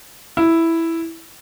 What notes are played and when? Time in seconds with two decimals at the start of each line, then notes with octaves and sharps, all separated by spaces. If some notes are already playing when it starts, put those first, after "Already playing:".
0.37 E4